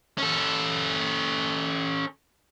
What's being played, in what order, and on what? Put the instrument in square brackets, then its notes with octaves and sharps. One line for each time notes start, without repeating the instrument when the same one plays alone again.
[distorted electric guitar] C#4 A4